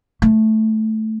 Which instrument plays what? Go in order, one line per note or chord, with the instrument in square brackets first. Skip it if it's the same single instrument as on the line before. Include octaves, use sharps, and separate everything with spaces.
[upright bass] A3